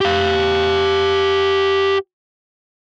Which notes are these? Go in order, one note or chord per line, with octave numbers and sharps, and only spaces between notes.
G4 F5